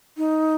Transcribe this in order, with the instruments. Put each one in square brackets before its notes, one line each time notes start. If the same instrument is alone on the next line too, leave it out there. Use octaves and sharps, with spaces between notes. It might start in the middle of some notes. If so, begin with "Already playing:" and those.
[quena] D#4